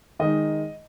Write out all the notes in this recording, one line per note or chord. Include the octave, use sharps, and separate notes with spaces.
D#3 G#3 D#4 D#5